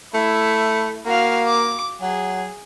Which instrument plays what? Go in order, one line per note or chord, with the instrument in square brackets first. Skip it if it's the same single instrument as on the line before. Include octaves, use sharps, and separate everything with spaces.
[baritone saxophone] A3 [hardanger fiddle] E4
[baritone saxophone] A#3 [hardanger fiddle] F#4 F5
[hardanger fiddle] D6
[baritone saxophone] F#3 [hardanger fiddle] G#4